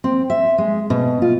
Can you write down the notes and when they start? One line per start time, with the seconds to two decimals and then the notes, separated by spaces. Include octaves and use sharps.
0.04 C4
0.30 E5
0.58 G#3
0.90 B2
1.22 F4